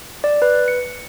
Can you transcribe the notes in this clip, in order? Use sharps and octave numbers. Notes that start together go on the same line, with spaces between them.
D5
B4
C#7